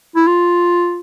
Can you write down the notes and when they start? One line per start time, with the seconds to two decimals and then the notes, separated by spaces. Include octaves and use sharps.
0.16 E4
0.27 F4